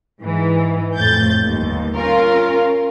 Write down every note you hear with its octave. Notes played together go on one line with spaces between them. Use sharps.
G#2 E3
F2 A2 G6 A6
G1 D#2
C#4 F4 A#4